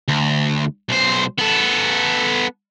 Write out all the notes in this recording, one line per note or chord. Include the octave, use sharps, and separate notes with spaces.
D2
B1 C5
B3 A4